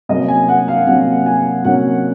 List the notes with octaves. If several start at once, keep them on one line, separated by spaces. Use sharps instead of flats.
C3 F#3 A#3 C#4 D#5
G#5
F#5
F5
C3 F#3 A#3 C#4 F#5
G#5
C3 F#3 A#3 C#4 F#5